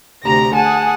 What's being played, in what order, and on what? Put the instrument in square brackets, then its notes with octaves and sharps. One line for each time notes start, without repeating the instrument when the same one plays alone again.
[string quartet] D2 C3 G4 A#5 A#6
G#4 F#5 G#5 A5